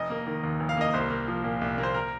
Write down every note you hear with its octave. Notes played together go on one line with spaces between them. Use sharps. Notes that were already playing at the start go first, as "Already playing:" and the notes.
Already playing: F1 D#5
A#3
D#3
D#2
F1
F5
A#3 D#5
C2 C5
A#3
F3
A#2
C2
A#3
C5
A#4